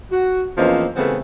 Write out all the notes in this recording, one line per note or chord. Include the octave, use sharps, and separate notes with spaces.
F#4
E2 F3 A#3 C4 C#4 D#5
C#3 E3 G3 A3 B3 C4